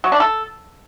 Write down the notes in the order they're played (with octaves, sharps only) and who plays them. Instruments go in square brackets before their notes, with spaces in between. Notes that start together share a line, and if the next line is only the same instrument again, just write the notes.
[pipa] F#3
D4
A4